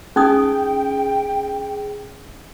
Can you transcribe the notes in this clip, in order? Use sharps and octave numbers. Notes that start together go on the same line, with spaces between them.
C#4 D#4 G#4 G5 D#6